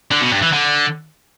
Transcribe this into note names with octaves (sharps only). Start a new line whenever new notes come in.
D3
B2
G2
E3
D3